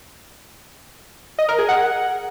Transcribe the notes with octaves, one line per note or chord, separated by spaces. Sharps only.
D#5
A#4
G#4
F#5